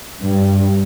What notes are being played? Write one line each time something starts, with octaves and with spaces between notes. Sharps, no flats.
G2